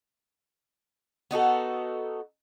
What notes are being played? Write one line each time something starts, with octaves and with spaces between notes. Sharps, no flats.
B3 D#4 F#4 A4